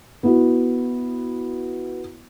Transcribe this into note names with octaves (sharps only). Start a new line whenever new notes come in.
B3 E4 F#4